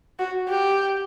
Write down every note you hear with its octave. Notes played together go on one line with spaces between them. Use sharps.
F#4
G4